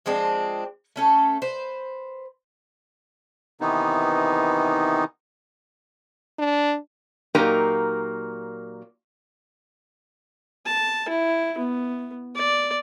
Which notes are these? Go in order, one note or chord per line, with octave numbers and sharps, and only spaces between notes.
F3 G#3 C4 D4
A3 C#4 A4
B4 C5
C3 D#3 E3 B3 D#4
D4
A#2 F#3 A#3 D#4 G4 A#4
A5
E4
B3
D5